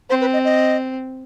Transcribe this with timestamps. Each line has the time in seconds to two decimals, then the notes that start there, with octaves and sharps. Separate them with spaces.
0.10 C4 C5
0.21 B4
0.33 D#5
0.44 D#5